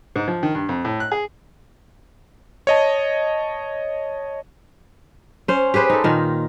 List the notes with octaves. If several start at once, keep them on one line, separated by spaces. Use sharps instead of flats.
G#2
F3
D#3
G2
F2
A2
F#6
G#4
C#5 D#5 A5
C#4 C5
G4 G#4 B4 C5
D#4 A4
A#2 D#3 D#4